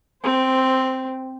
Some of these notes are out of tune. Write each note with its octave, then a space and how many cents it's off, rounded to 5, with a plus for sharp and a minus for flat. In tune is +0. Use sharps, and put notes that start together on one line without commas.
C4 +0 C5 -20